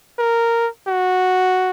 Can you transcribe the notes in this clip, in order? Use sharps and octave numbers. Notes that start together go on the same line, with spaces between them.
A#4
F#4